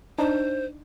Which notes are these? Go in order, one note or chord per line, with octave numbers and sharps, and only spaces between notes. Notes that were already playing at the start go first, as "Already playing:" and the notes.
D4 D#4 C5